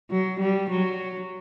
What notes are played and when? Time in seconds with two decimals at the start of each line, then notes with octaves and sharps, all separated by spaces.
0.11 F#3
0.40 G3
0.70 F#3